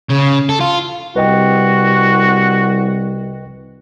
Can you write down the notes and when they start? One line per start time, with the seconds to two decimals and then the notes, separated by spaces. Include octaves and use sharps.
0.10 C#3
0.49 A4
0.60 F4
1.16 C2 F#4 B4 D#5 G5